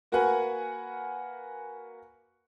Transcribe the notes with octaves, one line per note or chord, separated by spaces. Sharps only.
A#3 F#4 A#4 B4 F#5 G#5